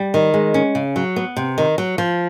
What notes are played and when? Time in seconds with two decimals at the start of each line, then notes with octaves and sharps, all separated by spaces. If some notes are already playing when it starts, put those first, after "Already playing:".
Already playing: G3
0.14 D#3
0.34 G#3
0.54 C#4
0.75 C#3
0.96 F#3
1.16 B3
1.36 C3
1.58 D#3
1.78 F#3
1.98 F3